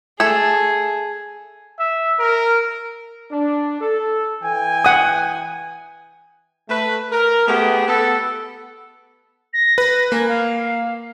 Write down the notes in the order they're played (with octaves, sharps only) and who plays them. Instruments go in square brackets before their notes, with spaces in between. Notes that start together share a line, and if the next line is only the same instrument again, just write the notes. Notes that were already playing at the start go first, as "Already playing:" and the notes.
[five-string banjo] A3 A4 [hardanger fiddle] G#4 [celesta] A5 G#6
[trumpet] E5
A#4
[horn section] D4
A4
E3 G5 G#5
[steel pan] F#5 D#6
[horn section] A3 B4
A#4
A3 B3 G4 G#4
B3 A4
[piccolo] A#6
[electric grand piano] B4
[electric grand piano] A#3 [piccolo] G#5
[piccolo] F5